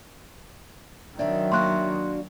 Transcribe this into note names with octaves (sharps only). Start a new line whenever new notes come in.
D#3 F#3 C4 D4 D5 E5
A#3 D4 F#4 C6 C#6 F#6